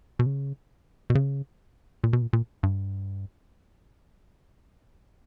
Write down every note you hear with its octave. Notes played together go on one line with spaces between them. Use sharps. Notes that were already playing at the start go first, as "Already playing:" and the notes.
B2
C#3
B2
C#3
A#2
B2
A#2
A#2
G2